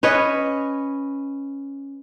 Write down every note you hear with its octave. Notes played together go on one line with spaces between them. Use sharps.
C#4 B4 C#5 D#5